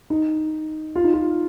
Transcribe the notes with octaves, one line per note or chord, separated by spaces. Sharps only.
D#4
F4
D#4
F4